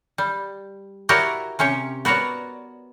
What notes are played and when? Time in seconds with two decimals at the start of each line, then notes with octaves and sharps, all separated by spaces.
0.18 G3
1.09 E4 F#4 G4 A#4 C#5 D5
1.59 C3 C#4 G4 C#5
2.05 B3 F#4 A#4 C#5 D5